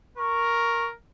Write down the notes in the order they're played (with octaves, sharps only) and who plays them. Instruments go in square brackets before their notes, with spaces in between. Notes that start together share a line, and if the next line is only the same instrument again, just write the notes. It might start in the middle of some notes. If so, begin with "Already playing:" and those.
[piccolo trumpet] A#4 [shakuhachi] C#6